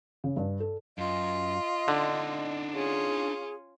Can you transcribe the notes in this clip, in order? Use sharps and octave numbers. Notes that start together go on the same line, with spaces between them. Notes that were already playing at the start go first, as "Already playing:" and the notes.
C#3
G2
A4
F#2 F4 D#5
D3 D4 D#4
C#4 F4 G#4